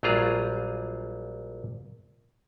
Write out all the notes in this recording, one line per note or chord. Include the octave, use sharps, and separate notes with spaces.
A#1 F#3 G3 F4 G#4 A#5